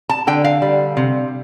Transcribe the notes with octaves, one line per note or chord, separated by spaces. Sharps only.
A5
D3 G5
F5
G3
C3